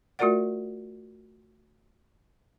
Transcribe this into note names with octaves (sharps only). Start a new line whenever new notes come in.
A3 F4 F#4 A#4 D5 F#5